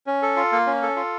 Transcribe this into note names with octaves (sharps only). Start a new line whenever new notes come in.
C#4
A4
F4
A#3
C#4
A4
F4